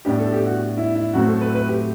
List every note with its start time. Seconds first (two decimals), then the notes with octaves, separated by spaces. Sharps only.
0.05 A2 G3 B3 D4 G4
0.19 A4
0.32 G4
0.46 F#4
0.77 E4
0.95 E4
1.13 A2 F#3 A3 C4 F#4
1.28 A4
1.41 B4
1.55 B4
1.68 G4